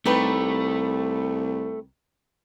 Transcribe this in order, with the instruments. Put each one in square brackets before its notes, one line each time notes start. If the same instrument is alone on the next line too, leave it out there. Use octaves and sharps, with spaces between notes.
[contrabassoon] C2 [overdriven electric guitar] A3 [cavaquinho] D#4 G4 B4